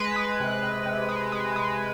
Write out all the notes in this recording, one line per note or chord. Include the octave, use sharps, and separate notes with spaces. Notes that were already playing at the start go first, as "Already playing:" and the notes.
Already playing: G#3 B4
G#3
C3
C3
C3
G#3
G#3
G#3